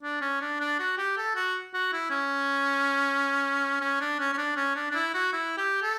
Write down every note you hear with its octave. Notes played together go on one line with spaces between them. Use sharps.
D4
C#4
D4
D4
F#4
G4
A4
F#4
F#4
E4
C#4
C#4
D4
C#4
C#4
D4
C#4
D4
D4
E4
F#4
E4
G4
A4